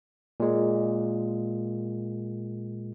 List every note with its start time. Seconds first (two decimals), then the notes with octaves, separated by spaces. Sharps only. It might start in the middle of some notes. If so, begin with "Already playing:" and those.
0.40 A#2 G#3